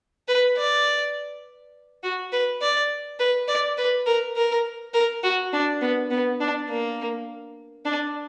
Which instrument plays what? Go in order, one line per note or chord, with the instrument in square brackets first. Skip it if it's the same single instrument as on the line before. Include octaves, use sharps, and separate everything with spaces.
[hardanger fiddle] B4
D5
F#4
B4
D5
B4
D5
B4
A#4
A#4
A#4
F#4
D4
B3
B3
D4
A#3
D4